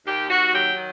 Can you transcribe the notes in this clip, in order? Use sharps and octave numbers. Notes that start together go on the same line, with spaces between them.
D#2 G4
D#2 F#4
F#3 G4
D#3